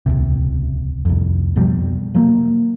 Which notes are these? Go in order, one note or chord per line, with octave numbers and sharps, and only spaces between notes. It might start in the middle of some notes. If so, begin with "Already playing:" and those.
D#1 C#2 C3
C2 F2
F2 B2 F3 G3
C3 F3 F#3 A#3